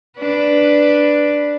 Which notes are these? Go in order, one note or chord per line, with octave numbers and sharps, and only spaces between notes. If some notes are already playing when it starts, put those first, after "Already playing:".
D4 B4